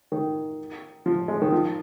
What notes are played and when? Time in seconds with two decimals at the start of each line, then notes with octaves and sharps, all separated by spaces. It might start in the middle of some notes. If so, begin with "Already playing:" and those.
0.12 D#3
1.06 F3
1.28 G#3
1.42 D#3
1.52 F3